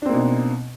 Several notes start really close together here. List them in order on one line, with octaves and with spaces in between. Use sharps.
D4 C4 A#3 B2 D#4